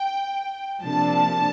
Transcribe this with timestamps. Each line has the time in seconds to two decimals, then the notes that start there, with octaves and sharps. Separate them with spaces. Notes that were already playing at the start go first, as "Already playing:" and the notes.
Already playing: G5
0.83 C3 F3 A#3 D4 A5